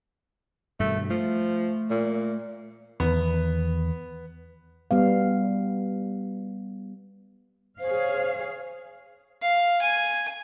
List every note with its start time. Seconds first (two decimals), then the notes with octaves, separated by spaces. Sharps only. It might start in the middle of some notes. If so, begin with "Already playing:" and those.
0.80 G2 B2 D#3 A3
1.10 F3 A3
1.90 A#2
3.00 E2 D#3 B3
4.91 G3 B3 F5
7.80 G#4 C5 C#5 F5
9.42 F5
9.82 G#5